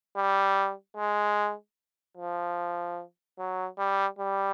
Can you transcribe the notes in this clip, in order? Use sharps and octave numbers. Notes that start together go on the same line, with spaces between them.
G3
G#3
F3
F#3
G3
G3